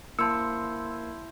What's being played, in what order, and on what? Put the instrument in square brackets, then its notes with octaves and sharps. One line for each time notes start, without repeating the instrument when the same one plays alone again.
[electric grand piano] A#3 [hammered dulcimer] E4 C5 [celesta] A5 C6 C#7 [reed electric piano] E6